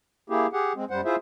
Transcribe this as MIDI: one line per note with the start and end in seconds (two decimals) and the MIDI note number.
0.30 0.47 58
0.30 0.47 64
0.30 0.47 67
0.30 0.47 68
0.53 0.73 67
0.53 0.73 68
0.53 0.73 78
0.75 0.85 56
0.75 0.85 60
0.90 1.01 42
0.90 1.01 55
0.90 1.01 72
0.90 1.01 78
1.05 1.16 64
1.05 1.16 65
1.05 1.16 68
1.05 1.16 72
1.05 1.16 76